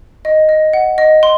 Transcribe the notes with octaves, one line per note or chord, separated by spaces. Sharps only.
D#5
D#5
F#5
D#5
C6